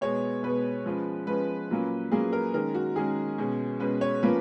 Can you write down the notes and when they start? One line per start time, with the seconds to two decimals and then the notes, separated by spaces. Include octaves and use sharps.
0.01 B2 G#3 B3 C#5
0.43 B2 G#3 B3 B4
0.86 F3 G#3 C#4
1.27 F3 G#3 C#4 B4
1.70 A#2 F#3 A#3 C#4
2.12 A#2 F#3 A#3 C#4 G#4
2.33 A#4
2.54 D#3 G#3 C#4 A#4
2.74 F#4
2.96 D#3 G#3 C#4 G#4
3.38 B2 G#3 C#4
3.80 B2 G#3 C#4 B4
4.01 C#5
4.23 A#2 F3 A#3 C#4 B4